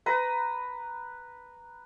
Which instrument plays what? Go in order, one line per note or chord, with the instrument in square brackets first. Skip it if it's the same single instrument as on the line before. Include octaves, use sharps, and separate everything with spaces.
[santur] B4 A#5